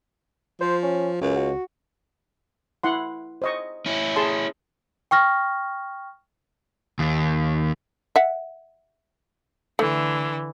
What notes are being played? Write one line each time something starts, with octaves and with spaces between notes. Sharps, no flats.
F3 C5
C#4
C#2 F#2
F#4
E4 F#5 C6
C5 D#5 C#6
C#4 E4
G#4 A5 C6
G5 C#6 F6 A#6
D#2
E5 F#5
D3 E3 A3